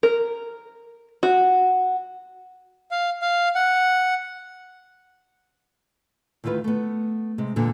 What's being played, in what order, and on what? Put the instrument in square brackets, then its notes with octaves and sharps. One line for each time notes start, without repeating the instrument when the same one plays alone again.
[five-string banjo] A#4
F#4
[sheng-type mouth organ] F5
F5
F#5
[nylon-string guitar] D2 D#3 E4 F4 B4
A3 B3
C3 G#3
E2 A#2 D3